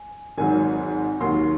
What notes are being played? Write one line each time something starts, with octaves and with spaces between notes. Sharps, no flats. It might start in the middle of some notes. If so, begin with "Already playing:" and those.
Already playing: G#5
G#1 G#2 F#3 G#5
D#2 D#3 F#3 C6